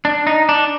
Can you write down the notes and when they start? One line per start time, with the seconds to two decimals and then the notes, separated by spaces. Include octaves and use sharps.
0.05 D4
0.27 D#4
0.49 D4